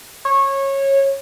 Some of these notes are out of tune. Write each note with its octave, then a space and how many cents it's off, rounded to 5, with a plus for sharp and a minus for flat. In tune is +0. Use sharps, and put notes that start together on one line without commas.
C#5 -20